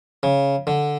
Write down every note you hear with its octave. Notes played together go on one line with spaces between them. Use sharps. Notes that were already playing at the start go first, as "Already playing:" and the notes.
C#3
D3